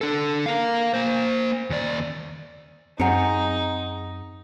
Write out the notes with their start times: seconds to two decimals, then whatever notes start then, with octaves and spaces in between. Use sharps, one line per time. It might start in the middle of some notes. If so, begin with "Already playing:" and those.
0.01 D4 A4
0.46 A#4 F5
0.94 A#3 C5
1.70 D#2 D5
3.00 F#2 C4 D#4 G#4 F#5 G#5 A#5 C#7